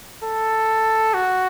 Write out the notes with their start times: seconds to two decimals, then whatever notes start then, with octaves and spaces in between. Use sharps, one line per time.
0.24 A4
1.14 F#4